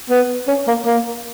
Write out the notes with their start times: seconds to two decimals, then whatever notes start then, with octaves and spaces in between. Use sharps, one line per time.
0.10 B3
0.48 C#4
0.67 A#3
0.86 A#3